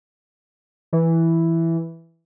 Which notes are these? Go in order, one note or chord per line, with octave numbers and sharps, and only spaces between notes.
E3